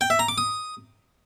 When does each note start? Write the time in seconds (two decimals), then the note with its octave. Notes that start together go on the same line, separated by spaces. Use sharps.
0.01 G5
0.10 E5
0.19 A#5
0.29 D6
0.38 D#6